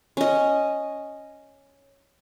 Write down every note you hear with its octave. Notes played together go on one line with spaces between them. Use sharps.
C#4 D#5